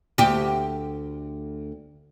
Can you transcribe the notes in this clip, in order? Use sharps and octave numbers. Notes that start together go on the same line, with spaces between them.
D2 G4